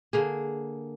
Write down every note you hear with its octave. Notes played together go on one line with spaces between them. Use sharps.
D3 A#3 G#4